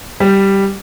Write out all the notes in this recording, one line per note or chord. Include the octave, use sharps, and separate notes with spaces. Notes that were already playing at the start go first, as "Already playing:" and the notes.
G3